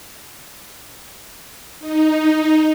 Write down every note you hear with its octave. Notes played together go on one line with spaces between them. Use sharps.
D#4